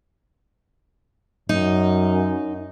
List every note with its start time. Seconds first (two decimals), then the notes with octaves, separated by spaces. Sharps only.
1.49 F#2 D#4